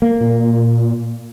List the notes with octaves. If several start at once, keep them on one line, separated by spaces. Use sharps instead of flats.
A#3
A#2